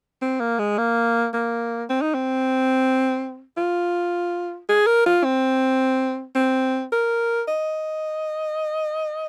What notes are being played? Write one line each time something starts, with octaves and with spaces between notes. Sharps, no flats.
C4
A#3
G#3
A#3
A#3
C4
D#4
C4
F4
G#4
A#4
F4
C4
C4
A#4
D#5